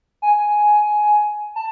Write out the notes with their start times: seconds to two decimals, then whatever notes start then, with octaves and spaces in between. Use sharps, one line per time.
0.22 G#5
1.56 A5